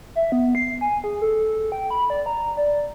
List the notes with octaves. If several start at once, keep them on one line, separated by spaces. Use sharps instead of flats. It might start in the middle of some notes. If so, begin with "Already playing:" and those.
E5
B3
C7
G#5
G#4
A4
G5
B5
D5
A#5
D5